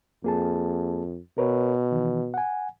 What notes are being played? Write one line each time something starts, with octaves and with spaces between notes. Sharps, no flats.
F2 A#3 G#4 A5
B2 A#4 B4 C#5
D#3 E3
F#5 G#5